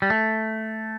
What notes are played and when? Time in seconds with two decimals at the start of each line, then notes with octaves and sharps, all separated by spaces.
0.02 G3
0.10 A3